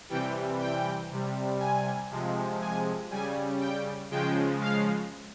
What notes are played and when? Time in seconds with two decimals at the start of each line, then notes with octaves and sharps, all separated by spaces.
0.09 C3 E3 G3 G5
0.60 G5
1.10 C3 G3
1.59 G#5
2.11 C3 F3 G#3
2.61 G#5
3.10 C#3 G3 G#5
3.61 G5
4.11 C#3 F3 G#3 G5
4.61 F5